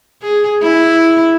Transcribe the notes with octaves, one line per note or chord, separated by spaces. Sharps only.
G#4
E4